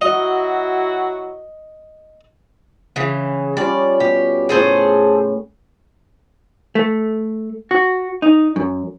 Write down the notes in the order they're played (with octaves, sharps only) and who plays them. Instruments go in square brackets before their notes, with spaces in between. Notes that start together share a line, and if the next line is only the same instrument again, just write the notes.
[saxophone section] F#3 E4 F#4 [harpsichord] D#5
[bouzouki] C#3 E3
[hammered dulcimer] G3 C#4 F4 [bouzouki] D5
[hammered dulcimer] B2 [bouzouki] G4
[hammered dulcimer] A2 C#3 [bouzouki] G#4 A4 C5
[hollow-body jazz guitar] A3
F#4
D#4
F#2